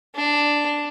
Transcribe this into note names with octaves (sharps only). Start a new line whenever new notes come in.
D4